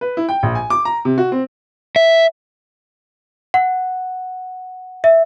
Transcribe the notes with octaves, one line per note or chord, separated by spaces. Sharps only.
B4
E4
G5
A#1
G#5
D6
A#5
C3
F#4
C4
E5
F#5
E5